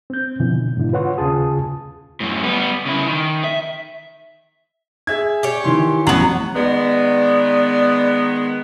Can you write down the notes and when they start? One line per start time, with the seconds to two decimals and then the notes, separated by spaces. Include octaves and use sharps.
0.10 C4 G6
0.40 B2 D3 E3 F3
0.77 G#2 B2 D3 E4
0.93 F4 B4 C#5 F#5 C6 C#6
1.18 D#2 C#3 F4 G#4 A5 D#6
2.20 F#2 A2
2.43 G3 B3
2.85 C#3 E4
3.07 D#3
3.44 E5
5.07 G#4 E5 G#6
5.43 G4 C#5
5.64 D#3 E3 C6
6.07 A1 F2 F#3 B3 F#7
6.56 D#3 G#3 B3 D5